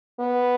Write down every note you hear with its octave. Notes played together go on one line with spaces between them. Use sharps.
B3